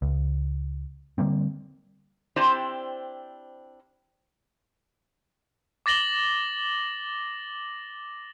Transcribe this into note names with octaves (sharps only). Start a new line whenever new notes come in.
C#2
D3 G3 A#3 C4
C4 D4 E4 G4 C5 D5
D6 A6 A#6 F#7 G7